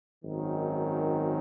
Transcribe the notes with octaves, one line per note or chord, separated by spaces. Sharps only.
G#1 F#2 D#3